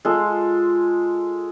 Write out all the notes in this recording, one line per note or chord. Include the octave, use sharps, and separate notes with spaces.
G#3 F4 A4